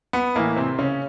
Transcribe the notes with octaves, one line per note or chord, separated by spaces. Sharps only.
B3
A2 E3 A#3
C3 C4
C#3 C#4